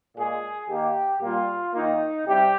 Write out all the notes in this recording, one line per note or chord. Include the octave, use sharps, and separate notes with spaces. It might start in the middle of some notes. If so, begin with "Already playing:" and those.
A#2 G#3 G#4
D#3 A#3 G4
A#2 G3 A#3 F4
D#3 A#3 D#4
C3 G3 G4